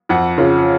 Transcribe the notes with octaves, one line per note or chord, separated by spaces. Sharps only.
F2 F#5
C#3 F3